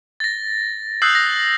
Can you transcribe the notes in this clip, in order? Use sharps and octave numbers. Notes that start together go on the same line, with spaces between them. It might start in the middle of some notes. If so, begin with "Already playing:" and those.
A6 A#6
D#6 E6 F#6 G6 C7 F#7
A#6